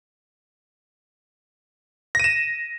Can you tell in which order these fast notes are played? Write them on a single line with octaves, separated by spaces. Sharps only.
A#6 D#7 E7